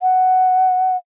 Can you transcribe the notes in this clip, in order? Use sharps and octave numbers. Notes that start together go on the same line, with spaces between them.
F#5